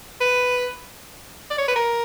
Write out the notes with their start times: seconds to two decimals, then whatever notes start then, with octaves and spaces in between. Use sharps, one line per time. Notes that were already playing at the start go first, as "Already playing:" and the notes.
0.21 B4
1.50 D5
1.58 C#5
1.68 B4
1.76 A#4